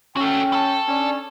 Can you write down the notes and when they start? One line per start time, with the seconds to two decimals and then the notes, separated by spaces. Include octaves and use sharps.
0.17 C#4 F#4 A4 G5
0.53 A4 A5
0.88 C#4 D4 D5